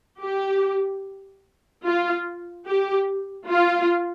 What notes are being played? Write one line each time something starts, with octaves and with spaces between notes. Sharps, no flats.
G4
F4
G4
F4